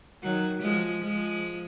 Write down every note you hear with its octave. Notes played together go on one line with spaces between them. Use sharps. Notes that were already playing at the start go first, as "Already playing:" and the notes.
D#3 F#3
F3 G#3
F3 G#3